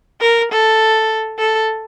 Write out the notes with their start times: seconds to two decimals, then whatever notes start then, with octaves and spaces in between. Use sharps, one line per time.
0.21 A#4
0.52 A4
1.39 A4